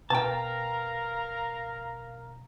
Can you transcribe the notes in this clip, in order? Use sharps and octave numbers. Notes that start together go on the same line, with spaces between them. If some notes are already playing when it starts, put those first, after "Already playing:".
B2 A#4 B4 F5 G5 A5 A#5